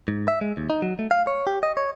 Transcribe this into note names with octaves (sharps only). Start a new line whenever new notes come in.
G#2
E5
G#3
D#2
D#4
F#3
A3
F5
C#5
G4
D#5
C#5